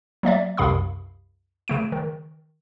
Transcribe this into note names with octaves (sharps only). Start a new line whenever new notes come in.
F#3 A#3 D5 E5
C2 F#2 C3 F5 B5 D#6
C#3 A3 D7
D#3